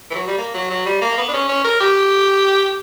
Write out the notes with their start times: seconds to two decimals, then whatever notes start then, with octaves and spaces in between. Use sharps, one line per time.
0.10 E3
0.15 F#3
0.27 G3
0.38 A#3
0.54 F#3
0.70 F#3
0.86 G3
1.02 A#3
1.18 B3
1.28 D4
1.33 C#4
1.48 C#4
1.64 A#4
1.80 G4